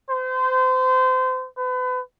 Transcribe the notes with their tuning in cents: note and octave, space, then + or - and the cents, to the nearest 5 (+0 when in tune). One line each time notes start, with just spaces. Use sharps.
C5 -30
B4 +35